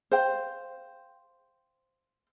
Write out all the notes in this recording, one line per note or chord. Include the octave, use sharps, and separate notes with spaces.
C5 F5 G5